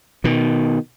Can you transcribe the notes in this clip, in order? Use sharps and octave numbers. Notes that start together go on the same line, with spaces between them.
B2 D#3